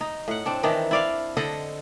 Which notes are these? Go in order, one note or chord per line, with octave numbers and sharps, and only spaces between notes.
D#4
A2 F#5
C4 D4
D#3 E3 D4 D#4
E4 D5 F5
D3 A4 D#5 F#5